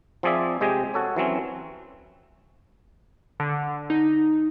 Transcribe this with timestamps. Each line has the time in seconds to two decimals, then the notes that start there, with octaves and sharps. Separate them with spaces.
0.23 F3 C4 G#4 D5 E5
0.61 C3 G#3 G4 D#5 G5 G#5
0.94 F#4 A4 C#5
1.16 E3 F#3 C4 C#4
3.40 D3
3.90 D#4